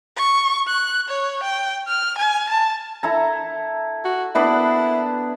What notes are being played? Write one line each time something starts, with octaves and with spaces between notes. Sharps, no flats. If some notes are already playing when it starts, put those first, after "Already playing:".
C#6
F#6
C#5
G5
F6
G#5
A5
E4 A4 A#5
F#4
B3 D4 E4 B4